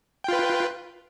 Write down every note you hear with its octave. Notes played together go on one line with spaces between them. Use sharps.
F4 B4 G5